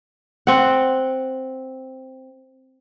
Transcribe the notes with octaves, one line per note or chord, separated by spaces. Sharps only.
C4 F#5